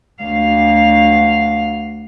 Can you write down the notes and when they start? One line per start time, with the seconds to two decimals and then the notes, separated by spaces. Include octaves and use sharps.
0.23 D2 F5